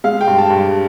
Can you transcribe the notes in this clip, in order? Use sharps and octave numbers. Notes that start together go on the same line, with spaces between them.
G#3 F5
G5
G2
A5
G2